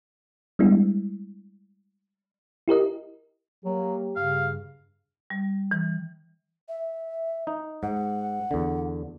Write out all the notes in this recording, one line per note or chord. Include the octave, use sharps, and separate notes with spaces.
G3 G#3 B3 D4 E4
E4 G4 A#4 D#5
F#3 A#3 G4
G2 C#3 F5
G3
E3
E5
D#4
G#2 F#5
E2 D3